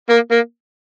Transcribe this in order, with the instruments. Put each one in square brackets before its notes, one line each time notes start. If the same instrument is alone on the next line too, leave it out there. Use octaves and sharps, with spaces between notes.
[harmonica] A#3
A#3